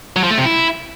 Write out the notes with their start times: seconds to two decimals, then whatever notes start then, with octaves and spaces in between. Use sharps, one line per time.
0.16 F#3
0.23 F3
0.31 A3
0.38 C3
0.45 E4